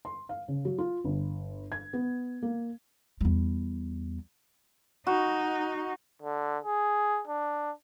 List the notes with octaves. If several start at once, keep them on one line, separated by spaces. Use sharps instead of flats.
C6
F5
C#3
F#3
F4
G1
G#6
B3
A#3
E2 G3
D#4 F#4
D3
G#4
D4